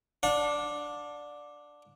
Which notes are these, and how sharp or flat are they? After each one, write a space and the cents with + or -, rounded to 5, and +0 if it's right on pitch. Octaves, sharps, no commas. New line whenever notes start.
D4 +0 F#5 -45